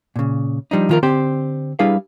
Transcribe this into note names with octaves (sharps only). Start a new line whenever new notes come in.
A#2 C#3
F3 G3 D4 D#4
D#3 F3 F4 A4 A#4
D3 C4 G4 C5
G3 D4 E4 G#4 B4 F5